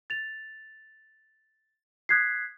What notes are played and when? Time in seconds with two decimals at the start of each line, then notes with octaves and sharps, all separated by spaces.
0.10 A6 F7
2.09 D#6 F#6 G#6 B6 C7